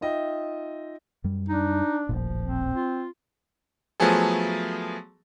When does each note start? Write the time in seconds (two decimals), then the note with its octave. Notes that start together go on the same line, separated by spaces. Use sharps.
0.01 D#4 F4 D#5 E5 G5
1.24 F#2 G3
1.49 D4 D#4
2.09 D#1 A1 A#2 F3
2.42 C4
2.74 F4
4.00 F3 F#3 A3 B3 G#4 A4